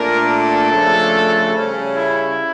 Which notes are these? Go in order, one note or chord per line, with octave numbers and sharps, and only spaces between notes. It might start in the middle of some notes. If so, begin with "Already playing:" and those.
Already playing: A#2 A3 D4 A#4
A4
C#3 F3 A3 D4
C#3 G3 C#4
E4